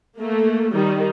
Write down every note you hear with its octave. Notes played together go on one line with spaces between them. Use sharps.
A3 A#3
D#3 G3 D#4